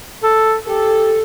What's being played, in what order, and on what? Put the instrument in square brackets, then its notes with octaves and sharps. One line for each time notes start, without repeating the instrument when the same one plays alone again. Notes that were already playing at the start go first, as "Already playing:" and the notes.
[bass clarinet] A4
[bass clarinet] G4 [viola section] A4